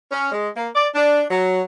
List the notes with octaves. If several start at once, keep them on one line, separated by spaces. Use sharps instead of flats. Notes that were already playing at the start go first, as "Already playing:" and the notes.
C#4
G#3
A#3
D5
D4
F#3